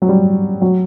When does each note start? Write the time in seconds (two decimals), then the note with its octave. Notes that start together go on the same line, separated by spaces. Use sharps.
0.02 F#3
0.09 G3
0.61 F#3